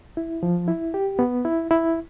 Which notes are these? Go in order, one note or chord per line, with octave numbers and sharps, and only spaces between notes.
E4
F3
E4
G4
B3
E4
E4